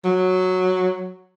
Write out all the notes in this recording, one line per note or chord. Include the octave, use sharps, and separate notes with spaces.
F#3